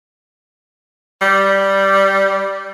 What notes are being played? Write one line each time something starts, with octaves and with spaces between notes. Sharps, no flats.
G3